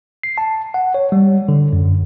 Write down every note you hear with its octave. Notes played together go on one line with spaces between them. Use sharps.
C7
A5
F#5
C#5
G3
D3
F#2